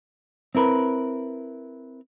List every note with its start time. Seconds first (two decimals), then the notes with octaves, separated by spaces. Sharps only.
0.55 C4 E4 A#4 B4